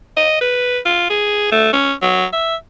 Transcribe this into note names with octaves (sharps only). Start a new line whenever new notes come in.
D#5
B4
F4
G#4
A3
C#4
F#3
E5